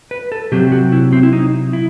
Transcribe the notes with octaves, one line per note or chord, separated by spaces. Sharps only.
B4
A4
C3 F#3 C4 G4
F#4
E4
C4
E4
D#4
E4